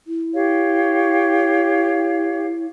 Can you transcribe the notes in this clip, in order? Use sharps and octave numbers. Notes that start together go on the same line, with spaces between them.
E4
G4 C#5 F5